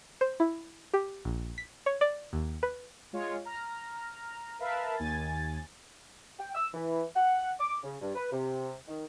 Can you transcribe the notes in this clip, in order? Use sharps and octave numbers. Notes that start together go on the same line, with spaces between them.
C5
E4
G4
A#1
B6
C#5
D5
D#2
B4
G#3 F4 C#5
A#5 F6
A#4 B4 E5 F5 A5 B5
D#2 G#5 A6
G5
E6
E3
F#5
D6
C#3
G2
B4
C3
D#3